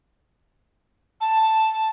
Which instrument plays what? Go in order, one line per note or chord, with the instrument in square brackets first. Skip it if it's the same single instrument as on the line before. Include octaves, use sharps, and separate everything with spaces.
[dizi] A5